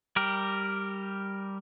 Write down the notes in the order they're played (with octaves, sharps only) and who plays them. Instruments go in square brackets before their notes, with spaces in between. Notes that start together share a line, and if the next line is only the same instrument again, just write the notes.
[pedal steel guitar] G3 G4 A#4